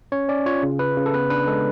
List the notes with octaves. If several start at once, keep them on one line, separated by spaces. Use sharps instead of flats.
C#4 C#5
C#4 D5
F4 C#5
C#3
C#3 B4
C#3
A4
B3 B4
D4 B4
G#3 A4